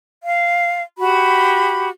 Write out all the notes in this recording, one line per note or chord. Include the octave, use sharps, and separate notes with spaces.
F5
F#4 G4 B5